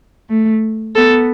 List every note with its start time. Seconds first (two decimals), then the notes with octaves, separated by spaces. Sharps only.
0.30 A3
0.95 B3 A4